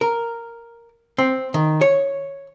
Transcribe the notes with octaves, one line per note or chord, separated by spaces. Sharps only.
A#4
C4
D#3
C#5